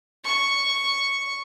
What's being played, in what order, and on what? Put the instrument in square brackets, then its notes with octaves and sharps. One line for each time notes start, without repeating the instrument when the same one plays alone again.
[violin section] C#6